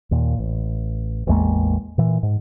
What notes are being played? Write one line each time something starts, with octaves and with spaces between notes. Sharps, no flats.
D#2 A#2
A1
A1 E2 G#3 A#3
A#2 E3
G#2